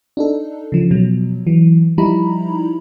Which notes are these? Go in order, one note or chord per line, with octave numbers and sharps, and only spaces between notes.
D4 D#4 A4
C#3 F3
B2 F3 F#3
E3 F#3
F3 G3 D#4 E4 A#5 B5